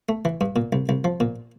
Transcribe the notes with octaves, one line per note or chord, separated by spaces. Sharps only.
A3
E3
G2
A#2
C2
C2
F3
A#2